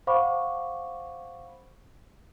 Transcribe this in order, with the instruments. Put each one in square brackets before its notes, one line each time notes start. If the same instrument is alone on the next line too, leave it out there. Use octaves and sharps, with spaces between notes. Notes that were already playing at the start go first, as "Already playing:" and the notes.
[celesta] C5 F5 F#5 B5 C#6 D6